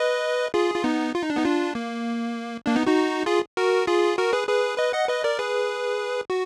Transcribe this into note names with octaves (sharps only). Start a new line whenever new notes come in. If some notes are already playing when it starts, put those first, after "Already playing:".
Already playing: B4 D#5
F4 G#4
F4
B3 D#4
F4
D#4
D4
B3 D#4
D4 F4
A#3
A#3 D4
B3 D#4
D#4 F#4
F4 G#4
F#4 A#4
F4 G#4
F#4 A#4
G#4 B4
G#4 B4
B4 D#5
D#5 F#5
B4 D#5
A#4 D5
G#4 B4
F#4